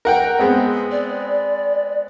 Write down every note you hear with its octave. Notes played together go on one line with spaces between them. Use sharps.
A#4 F#5 G5
G#3 B3 C4
D5